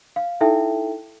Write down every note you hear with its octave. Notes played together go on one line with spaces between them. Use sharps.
F5
D#4 E4 A4 E5 G5